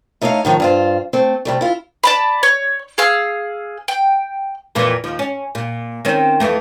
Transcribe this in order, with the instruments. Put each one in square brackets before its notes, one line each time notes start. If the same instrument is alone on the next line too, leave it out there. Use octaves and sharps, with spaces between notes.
[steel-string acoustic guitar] A3 D#4 C#5 D5 F5
A2 D#3 F3
G2 F4 C5
A3 C4
C3 G3 A3
E4 F4
[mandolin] D5 A5 B5
C#5
G#4 F5 E6
G5
[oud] F2 A#2 E3
D#2 F3
C#4
A#2
D#3 C4 C#4
F2 E3 A3